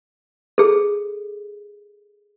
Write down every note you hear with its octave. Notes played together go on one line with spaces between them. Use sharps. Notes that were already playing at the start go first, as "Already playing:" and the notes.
G#4 A4